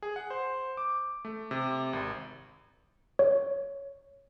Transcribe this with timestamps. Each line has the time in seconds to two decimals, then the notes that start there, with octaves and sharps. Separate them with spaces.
0.02 G#4
0.16 F#5
0.30 C5
0.77 D6
1.25 A3
1.51 C3
1.93 G#1
3.19 C#5